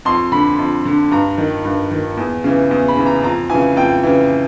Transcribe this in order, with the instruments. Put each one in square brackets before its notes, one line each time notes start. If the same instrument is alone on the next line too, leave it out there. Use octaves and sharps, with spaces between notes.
[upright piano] F2 C6
D3 B5
F2
D3
G2 A#5
D#3
G2
D#3
E2
C#3 E3
E2
B5
C#3 E3
A#5
F2 A#5
C#3 E3 G#5
F2 G5
C#3 E3